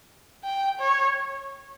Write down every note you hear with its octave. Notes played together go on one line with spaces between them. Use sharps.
G5
C#5